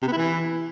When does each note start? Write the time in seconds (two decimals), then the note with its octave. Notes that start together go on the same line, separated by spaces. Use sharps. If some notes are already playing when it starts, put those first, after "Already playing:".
0.02 C3
0.07 B3
0.12 E4
0.17 E3